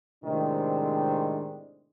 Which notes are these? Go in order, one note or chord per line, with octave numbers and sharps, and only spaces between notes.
A2 C3 D#3 G#3 C4 D4